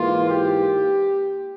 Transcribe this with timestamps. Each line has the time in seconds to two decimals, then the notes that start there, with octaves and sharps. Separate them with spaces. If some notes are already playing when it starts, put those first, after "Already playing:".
Already playing: G#2 E3 A#3 F4
0.29 G4